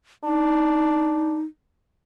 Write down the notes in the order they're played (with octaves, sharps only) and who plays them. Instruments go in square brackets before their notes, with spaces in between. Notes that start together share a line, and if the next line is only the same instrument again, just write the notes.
[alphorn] D4 [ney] D#4